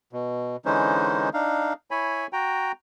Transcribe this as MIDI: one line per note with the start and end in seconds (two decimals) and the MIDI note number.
0.13 0.56 47
0.65 1.29 50
0.65 1.29 52
0.65 1.29 56
0.65 1.29 61
0.65 1.29 63
0.65 1.29 72
1.34 1.73 62
1.34 1.73 63
1.34 1.73 77
1.91 2.27 64
1.91 2.27 73
1.91 2.27 80
1.91 2.27 83
2.33 2.72 66
2.33 2.72 79
2.33 2.72 82